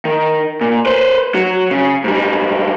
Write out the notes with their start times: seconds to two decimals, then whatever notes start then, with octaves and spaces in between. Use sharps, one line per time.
0.05 D#3
0.61 A#2
0.86 B4 C5
1.35 F#3
1.71 C#3
2.04 G#2 G3